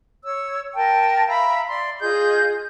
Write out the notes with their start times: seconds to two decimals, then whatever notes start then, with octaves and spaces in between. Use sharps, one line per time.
0.24 C#5 E6
0.74 A#4 G5 A5
1.27 E5 F5 A#5 B5
1.67 D5 C6
2.00 F4 G#4 D#5 G6